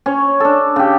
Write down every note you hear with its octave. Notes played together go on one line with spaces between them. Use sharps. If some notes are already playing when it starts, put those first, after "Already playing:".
C#4 C#5
D4 A4
C#3 G4